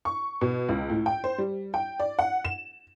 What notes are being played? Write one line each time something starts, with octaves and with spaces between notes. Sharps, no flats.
C#6
B2
C#2
A2
G5
C5
G3
G5
D5
F#5
E7